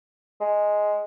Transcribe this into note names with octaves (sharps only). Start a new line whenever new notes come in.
G#3